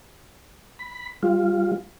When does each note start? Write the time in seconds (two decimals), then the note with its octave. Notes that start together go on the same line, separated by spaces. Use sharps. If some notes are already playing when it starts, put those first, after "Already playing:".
0.79 B5
1.23 G3 F4